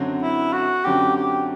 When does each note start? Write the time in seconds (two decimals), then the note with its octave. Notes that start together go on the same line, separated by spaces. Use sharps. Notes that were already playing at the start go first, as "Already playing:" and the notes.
Already playing: F#2 D3 F#3 C4
0.22 E4
0.53 F#4
0.84 F#2 D3 F#3 C4 G4
1.16 G4